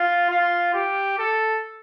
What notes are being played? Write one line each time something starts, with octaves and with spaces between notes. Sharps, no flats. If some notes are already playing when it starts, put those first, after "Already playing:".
Already playing: F4
F4
G4
A4